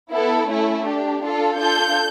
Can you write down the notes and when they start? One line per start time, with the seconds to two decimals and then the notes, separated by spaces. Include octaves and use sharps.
0.11 B3 E4 A4
0.48 A3 C#4 E4
0.85 D4 G4
1.22 D4 F4 A4
1.58 D4 F4 A4 G6